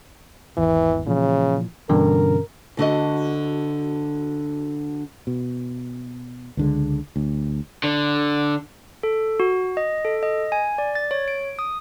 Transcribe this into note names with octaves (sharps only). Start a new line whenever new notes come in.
G#1 E2 E3
A#2 C#3 E3 F3
G2 B2 D3 E3 C#4 A#4
D2 D3 F#4 D#5
B2
C#2 D3 G#3
D2
D3
A4
F#4
D#5
A4
D#5
G#5
D5
A6
C#5
D7
D#6